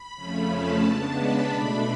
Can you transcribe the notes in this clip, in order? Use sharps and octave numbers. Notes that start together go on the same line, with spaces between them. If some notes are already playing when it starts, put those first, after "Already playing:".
Already playing: B5
F2 C#3 F3 A3 C#4
A5
C#3 G#3 B3 D4
B5
B2 A3 D4